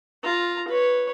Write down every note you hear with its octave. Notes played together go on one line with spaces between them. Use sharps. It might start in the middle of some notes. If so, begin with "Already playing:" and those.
F4 A#5
B4 C#5